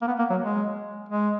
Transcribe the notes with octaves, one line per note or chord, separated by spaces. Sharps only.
A#3
B3
A#3
F#3
G#3
G#3